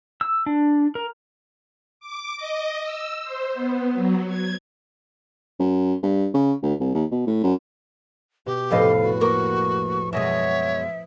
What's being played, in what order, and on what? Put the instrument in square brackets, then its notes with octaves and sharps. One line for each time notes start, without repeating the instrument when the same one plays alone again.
[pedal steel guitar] E6
D4
A#4
[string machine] D6
D#5
E6
C5
B3
F#3
G#6
[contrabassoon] F#2
G2
C#3
D2
C2
D#2
B2
A2
F#2
[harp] B2 [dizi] G4
[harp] F1 A2 B4 [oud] C3 A4 D#5 [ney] F5
[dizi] F#4
[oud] A#3 A#4 [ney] C#6
[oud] F#2 B2 G#3 [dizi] C#5 [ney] E5 [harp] D#6 A#6 E7